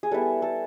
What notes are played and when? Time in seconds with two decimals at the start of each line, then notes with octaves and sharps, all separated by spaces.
0.03 G#4
0.11 G3 B3 E4 A4
0.42 A4